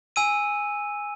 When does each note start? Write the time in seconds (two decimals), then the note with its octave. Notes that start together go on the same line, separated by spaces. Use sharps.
0.16 G#5 E6 D#7